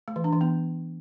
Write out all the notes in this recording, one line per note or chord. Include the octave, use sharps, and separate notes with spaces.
A3
E3
D4
E3
B3